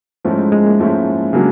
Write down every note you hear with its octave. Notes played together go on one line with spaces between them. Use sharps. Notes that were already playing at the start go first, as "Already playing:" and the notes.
G#2 F3 G#3 A3 C#4 E4
G#3
G#3
A#3
G#2 F3 A3 C#4 E4
C#3 F#3 A#3 D4